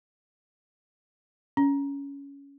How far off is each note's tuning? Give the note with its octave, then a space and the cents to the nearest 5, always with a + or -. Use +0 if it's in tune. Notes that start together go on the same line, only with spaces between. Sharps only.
C#4 +15